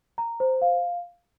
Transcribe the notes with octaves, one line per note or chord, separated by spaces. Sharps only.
A#5
C5
F5